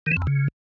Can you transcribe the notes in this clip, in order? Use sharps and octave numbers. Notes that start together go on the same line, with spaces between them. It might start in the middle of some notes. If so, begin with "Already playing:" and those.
D#3
E3
F2
E2
C#3